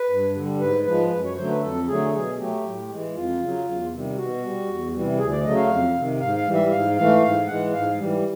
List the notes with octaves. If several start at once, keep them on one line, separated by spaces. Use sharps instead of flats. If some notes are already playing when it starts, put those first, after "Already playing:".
Already playing: B4
G2
D3 G3
G#2 B4
F3 G#3 B4
F#2 B4
C#5
D3 F#3 A3 C5
B4
F2 A4
D3 F#3 A3 G#4
B2 G#4
F#3 A3 G4
A2
E3 G#3
F2 F4
C#3 F#3
E2
C3 D#3 G3
B2 F#4
G3
E2
C3 E3 G3
D2 G#4
D5
C#3 F#3 A3 D#5
F5
F2
C3 D#3
G#2 F5
F5
E3 G3
E5
G#2 F5
E3 A3 F5
G#2 F5
E3 G#3 F#5
G#2 F5
E3 G3